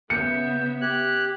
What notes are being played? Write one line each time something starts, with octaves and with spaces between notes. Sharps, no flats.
C#3 B3 E5 G6 C#7
G4 F#6 G#6